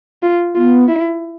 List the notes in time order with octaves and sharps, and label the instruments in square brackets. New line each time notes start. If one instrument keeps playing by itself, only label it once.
[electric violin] F4
[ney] B3 [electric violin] F4
[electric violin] E4